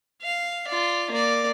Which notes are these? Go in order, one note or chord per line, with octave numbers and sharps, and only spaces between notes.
F5
F4 D5
A#3 D5